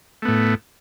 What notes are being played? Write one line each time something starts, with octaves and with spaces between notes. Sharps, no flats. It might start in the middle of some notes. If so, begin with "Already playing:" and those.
A2 A3 B3